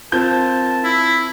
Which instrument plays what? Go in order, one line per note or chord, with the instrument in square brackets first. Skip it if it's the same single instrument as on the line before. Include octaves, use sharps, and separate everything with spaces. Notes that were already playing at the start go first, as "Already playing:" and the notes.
[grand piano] C4 F4 G6 [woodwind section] A#4 A5
[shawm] E4